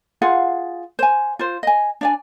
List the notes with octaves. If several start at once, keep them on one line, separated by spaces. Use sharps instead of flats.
F4 G#4 F5 F#5
C5 G#5
F4 C5
D#5 G#5
D4 D5 G#5